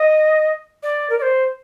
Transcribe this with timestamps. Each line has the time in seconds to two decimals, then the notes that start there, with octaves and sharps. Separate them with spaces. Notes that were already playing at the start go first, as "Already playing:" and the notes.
Already playing: D#5
0.83 D5
1.10 A#4
1.19 D5
1.22 C5